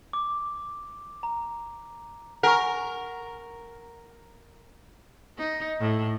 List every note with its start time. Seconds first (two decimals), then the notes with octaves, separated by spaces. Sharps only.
0.13 D6
1.23 A#5
2.43 A#4 F#5 G#5 C#6
5.38 D#4
5.80 A2